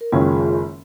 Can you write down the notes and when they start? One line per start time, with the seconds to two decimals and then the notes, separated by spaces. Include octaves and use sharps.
0.01 A#4
0.12 F#1 F#2 D#3 G#3 C#4 F4 G#4
0.32 F4 G#4